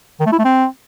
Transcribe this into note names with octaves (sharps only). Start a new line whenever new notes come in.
D#3
A3
E4
A3
C4